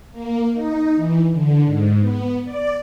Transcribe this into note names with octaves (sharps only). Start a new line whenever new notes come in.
A#3
D#4
E3
D3
G#2
B3
D5